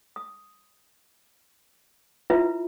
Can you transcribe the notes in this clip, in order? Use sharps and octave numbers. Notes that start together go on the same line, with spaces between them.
D#6
E4 F4 B4 E5